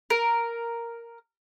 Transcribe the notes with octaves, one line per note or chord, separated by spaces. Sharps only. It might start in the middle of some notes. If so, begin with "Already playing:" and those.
A#4